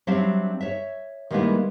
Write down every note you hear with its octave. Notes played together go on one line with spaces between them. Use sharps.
F#3 G3 C4 D4 E5 F5
C#5 E5
D#3 G3 G#3 A#3 B3 E4